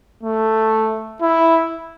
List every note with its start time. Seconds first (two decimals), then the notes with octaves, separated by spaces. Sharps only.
0.23 A3
1.22 E4